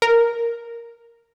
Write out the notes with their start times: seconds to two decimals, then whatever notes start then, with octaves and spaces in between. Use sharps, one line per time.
0.02 A#4